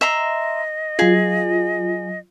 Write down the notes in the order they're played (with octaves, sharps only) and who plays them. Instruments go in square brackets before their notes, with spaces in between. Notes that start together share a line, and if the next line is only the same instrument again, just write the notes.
[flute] D#5 [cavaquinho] E5 A#5 C6
[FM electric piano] F#3 F4 [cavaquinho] G#4